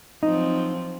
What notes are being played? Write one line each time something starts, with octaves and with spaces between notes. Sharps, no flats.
F3 F#3 C4 D#4